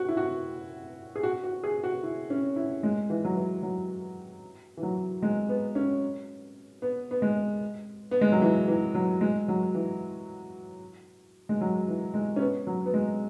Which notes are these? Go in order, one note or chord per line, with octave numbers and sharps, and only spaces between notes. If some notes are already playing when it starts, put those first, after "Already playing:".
Already playing: F#4
E4
F#4
G#4
F#4
F#4
G#4
F#4
E4
C#4
E4
G#3
E3
F#3
E3
F#3
E3
F#3
G#3
B3
C#4
B3
B3
G#3
B3
G#3
F#3
E3
E3
F#3
G#3
F#3
E3
G#3
F#3
E3
G#3
C#4
B3
F#3
B3
G#3